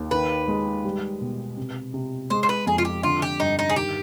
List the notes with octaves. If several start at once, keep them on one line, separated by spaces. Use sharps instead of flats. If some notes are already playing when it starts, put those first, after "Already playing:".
Already playing: D#2
D#3 B4
G#3
G3
B2
C3
C3
G#3 C5
C5
B4
F2 G#4
F4
G4
D3 F4
G4
G2 D#4
D#4
G#4
D#3 G4